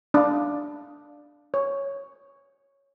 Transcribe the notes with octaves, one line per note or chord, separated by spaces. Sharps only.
D4 F5
C#5